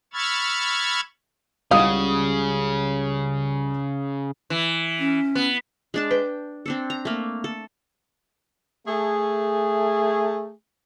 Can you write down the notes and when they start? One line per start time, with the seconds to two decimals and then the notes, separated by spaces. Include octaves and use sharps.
0.13 B5 C#6 E6 F6 G#6 A6
1.71 C#2 C#3 G3 F5 F#5 D#6
4.50 E3
4.99 C#4
5.35 B3
5.94 G#3 D4 A5
6.11 B4 G5
6.66 C4 D4 A4
6.90 A#5
7.05 A3 A#3
7.44 A4
8.86 A3 G#4